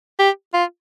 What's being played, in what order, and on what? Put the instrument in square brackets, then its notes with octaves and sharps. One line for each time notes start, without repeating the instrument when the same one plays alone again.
[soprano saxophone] G4
F4